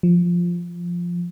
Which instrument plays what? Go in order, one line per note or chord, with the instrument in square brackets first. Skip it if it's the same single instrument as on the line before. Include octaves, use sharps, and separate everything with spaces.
[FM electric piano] F3